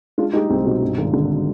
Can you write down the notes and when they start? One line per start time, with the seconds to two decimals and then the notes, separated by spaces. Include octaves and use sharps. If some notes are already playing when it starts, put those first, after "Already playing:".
0.18 G#3 D4 F4
0.33 G#3 D#4 G4
0.50 C2 C4 D#4
0.65 B2 C4 D#4
0.82 G2
0.98 G#1
1.13 D3